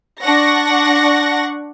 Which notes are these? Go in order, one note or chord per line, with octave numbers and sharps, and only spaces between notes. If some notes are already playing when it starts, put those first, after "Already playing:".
D4 F#5 C#6 A#6